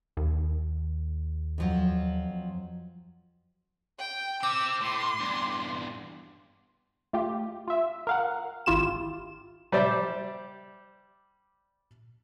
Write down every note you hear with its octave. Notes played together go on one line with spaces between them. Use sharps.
D#2
F2 F3 F#3
G5
C4 G4 D6 E6
A2 C6
E2 G2
A3 F4 G4
F4 E5
A#4 F5 F#5
G#1 E4 F4 G4 E7
G3 C5 D5 E5